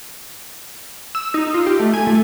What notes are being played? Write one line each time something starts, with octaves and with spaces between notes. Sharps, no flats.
E6
D#4
F4
G4
A3
G#5
A3